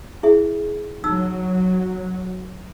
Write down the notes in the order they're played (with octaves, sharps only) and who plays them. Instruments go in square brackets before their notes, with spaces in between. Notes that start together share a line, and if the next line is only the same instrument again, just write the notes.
[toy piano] E4 G#4 E5
[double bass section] F#3 [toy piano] D#4 E6